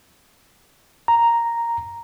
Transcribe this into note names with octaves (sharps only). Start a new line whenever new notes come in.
A#5